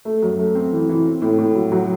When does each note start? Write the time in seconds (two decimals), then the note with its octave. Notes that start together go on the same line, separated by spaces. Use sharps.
0.05 A3
0.23 F#2
0.39 A3
0.55 C4
0.72 E3
0.89 E3
1.05 C4
1.22 A2
1.39 A2
1.55 F#3
1.72 F#3